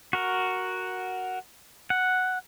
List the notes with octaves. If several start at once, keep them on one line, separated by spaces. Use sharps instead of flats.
F#4 A#4
F#5